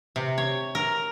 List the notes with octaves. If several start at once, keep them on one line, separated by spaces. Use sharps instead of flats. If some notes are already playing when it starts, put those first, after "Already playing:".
C3
C#5
A#4